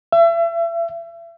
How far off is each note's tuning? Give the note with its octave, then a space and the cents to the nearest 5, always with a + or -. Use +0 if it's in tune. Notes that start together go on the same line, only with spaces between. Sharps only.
E5 +35